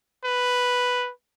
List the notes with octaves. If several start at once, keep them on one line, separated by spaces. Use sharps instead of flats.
B4